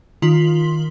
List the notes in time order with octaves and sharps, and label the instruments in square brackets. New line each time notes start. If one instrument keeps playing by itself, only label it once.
[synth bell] D#3 F4 C6 B6 F#7